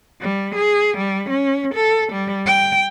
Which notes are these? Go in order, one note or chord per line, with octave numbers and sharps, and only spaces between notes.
G3
G#4
G3
C#4
A4
G3
G5